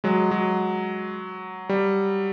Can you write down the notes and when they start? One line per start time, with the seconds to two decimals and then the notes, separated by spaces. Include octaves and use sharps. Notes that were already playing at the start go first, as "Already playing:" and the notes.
0.04 F#3 G#3
0.31 F#3
1.69 G3